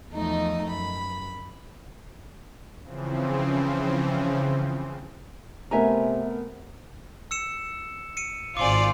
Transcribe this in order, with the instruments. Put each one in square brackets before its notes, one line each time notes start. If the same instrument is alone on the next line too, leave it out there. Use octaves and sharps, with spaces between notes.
[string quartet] E2 F3 A3 D#4 D#5
F#2 B5
[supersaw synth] C#3 E3 F3 C4
[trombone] C3 [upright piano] A3 B3 A#4 [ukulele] E5 G#5 A#5
[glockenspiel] E6 C#7 E7
C#7 D#7
[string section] G#1 [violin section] F4 C5 D5 [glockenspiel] G#5 C6 D6